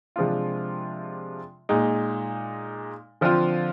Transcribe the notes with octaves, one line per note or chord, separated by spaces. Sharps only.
C3 F3 G#3 D4 F4
A#2 G#3 D#4
D3 F3 C4 F4